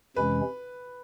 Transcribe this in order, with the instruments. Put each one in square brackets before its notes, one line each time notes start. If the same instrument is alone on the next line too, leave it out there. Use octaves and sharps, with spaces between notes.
[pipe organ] F2 C3 E3 G#3 C#4 [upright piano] B4